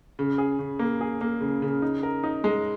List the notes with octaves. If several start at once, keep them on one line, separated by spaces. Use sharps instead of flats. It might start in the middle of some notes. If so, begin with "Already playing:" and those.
C#3
G#4
C#3
A#3
G#4
A#3
C#3
C#3
D#4
A#4
D#4
G#3